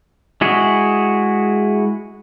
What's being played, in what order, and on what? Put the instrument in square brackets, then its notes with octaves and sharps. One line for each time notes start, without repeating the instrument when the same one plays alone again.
[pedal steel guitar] G#3 E4 F#4 G#4